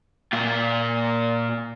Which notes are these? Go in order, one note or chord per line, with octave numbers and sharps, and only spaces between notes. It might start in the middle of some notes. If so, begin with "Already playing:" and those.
A#2 F4